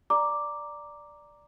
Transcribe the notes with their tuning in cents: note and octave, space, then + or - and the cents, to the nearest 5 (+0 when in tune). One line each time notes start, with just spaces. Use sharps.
D5 +0 A#5 +0 D6 +0